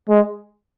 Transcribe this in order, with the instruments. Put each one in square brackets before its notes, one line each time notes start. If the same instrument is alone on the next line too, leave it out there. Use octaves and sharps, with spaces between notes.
[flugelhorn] G#3